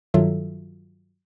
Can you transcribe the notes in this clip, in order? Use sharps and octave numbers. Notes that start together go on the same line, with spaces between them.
G2 D#3 F#3 F4 A4 E5